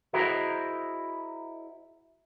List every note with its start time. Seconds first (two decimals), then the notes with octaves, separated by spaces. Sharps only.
0.13 E4 F#4 G#4 A#4 C5 D#5